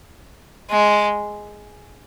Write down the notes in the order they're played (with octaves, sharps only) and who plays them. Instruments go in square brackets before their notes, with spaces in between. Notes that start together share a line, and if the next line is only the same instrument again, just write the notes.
[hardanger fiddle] G#3